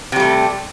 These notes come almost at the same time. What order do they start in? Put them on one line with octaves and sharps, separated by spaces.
C3 G3 A3